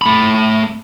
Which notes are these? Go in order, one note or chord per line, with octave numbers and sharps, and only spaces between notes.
A3 B5